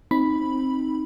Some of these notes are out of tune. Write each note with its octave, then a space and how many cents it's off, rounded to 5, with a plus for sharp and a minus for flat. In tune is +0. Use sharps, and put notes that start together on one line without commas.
C4 +15 D#4 +0 B5 +0